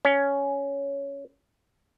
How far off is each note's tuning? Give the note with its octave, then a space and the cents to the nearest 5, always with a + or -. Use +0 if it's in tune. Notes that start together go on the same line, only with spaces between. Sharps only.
C#4 +10